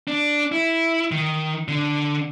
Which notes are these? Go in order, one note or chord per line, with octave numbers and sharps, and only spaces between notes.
D4
E4
D#3
D3